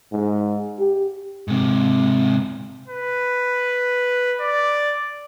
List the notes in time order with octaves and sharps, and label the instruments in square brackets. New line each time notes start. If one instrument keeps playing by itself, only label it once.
[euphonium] G#2
G4
[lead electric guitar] G#2 C3
[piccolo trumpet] B4
D5